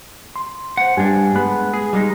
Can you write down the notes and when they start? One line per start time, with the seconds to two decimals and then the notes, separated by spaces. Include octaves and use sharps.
0.36 C6
0.77 C5 F#5
0.97 G2 D4 G4 G#5
1.36 G#3 B3 B5 F#6
1.74 G#4
1.93 G3 G#3 D#4